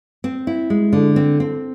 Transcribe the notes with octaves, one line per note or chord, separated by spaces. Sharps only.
C4
E4
G#3
D3
C4
C4